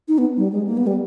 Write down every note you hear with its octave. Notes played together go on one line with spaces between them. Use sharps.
D#4
B3
G3
G#3
A#3
B3
G3